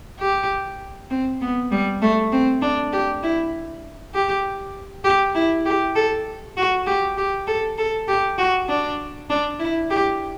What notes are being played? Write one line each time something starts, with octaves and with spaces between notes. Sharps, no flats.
G4
C4
B3
G3
A3
C4
D4
G4
E4
G4
G4
E4
G4
A4
F#4
G4
G4
A4
A4
G4
F#4
D4
D4
E4
G4